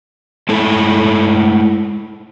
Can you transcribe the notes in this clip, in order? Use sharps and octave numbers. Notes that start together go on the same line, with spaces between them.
G#3 A3 E4 A4